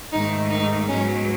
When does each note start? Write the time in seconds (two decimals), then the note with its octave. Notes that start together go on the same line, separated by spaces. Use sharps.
0.11 G#2 D#3 A3 D#4
0.50 D#4
0.88 G#2 F#3 B3 C#4